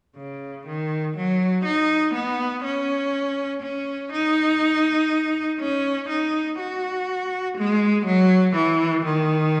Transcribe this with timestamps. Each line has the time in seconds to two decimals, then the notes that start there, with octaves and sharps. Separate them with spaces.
0.17 C#3
0.66 D#3
1.16 F#3
1.65 D#4
2.15 B3
2.64 C#4
3.62 C#4
4.12 D#4
5.60 C#4
6.09 D#4
6.59 F#4
7.58 G#3
8.06 F#3
8.55 E3
9.05 D#3